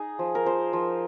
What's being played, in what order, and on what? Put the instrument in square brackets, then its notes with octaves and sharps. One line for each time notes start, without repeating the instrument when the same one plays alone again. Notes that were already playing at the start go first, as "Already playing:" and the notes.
Already playing: [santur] D#4 G#4
F3
A#4
F3 C5
F3